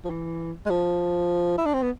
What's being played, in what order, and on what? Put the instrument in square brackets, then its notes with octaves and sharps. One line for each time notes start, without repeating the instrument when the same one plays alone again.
[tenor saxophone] F3
E3
G#3
F3
E4
D4
C4
B3